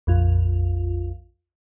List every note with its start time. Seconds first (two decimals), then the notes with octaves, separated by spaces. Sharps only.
0.07 A#1 F2 F4